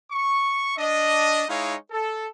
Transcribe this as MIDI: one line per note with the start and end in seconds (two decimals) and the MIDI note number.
0.12 0.73 85
0.78 1.44 62
0.78 1.44 75
1.48 1.74 56
1.48 1.74 63
1.48 1.74 64
1.48 1.74 73
1.48 1.74 77
1.91 2.26 69